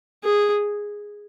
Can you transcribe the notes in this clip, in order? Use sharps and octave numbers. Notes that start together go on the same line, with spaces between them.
G#4